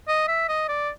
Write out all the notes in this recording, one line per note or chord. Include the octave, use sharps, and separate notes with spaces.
D#5
E5
D#5
D5